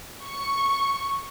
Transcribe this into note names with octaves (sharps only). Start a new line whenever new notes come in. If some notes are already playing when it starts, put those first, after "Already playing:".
C#6